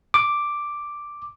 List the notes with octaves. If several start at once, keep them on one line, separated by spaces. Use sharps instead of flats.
D6